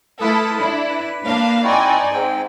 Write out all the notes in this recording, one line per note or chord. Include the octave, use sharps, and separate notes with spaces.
A3 E4 F4 A4 B4 D#6
D4 E4
B4
A#3 D4 F5
C4 D#4 E4 F#4 D5 G#5
G#2 C4 G5